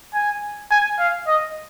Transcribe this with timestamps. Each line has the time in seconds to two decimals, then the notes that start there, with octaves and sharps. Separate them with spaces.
0.14 G#5
0.71 G#5
0.99 F5
1.27 D#5